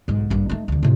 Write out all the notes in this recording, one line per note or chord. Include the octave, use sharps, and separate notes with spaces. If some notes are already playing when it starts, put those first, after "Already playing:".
B1 G#2
A#1 G2
A3 D#4
E1 D2
A2 C3